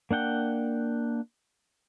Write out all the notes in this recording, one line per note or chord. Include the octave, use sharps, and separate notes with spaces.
A#3 D4 F#5 G5